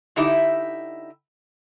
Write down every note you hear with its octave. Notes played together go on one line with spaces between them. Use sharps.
D3 D#4 E4 G4 E5